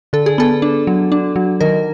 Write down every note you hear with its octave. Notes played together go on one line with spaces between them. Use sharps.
D3 A4
G#4
B3 A4
D4
F#3
D4
F#3
D#3 A#4